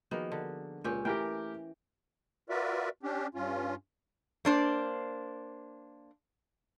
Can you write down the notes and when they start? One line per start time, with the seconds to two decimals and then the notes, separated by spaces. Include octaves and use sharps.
0.11 D#3 F3 A#3 B3 F#4 G#4
0.32 D3
0.84 C#2 A#2 C#4 G4 G#4
1.05 E3 A3 G4 A#4 G5
2.50 F4 F#4 A#4 B4 D5 E5
3.03 C#4 D4 G4
3.35 G2 C#4 F4
4.45 A#3 D4 C5